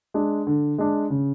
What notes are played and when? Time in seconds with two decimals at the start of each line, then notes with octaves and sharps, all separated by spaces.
0.14 G#3 D4
0.47 D3
0.78 G#3 D4
1.10 C#3